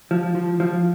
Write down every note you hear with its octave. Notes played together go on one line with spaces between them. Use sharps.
F3
F3
F3